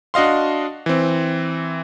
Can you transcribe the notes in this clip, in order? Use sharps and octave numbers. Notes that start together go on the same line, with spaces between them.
D4 F#4 D#5 F5 C6
E3 C4